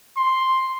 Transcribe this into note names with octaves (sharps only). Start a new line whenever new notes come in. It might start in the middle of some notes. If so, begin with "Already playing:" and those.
C6